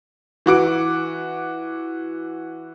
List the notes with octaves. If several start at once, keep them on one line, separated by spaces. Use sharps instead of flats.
E3 F#4 D6 D7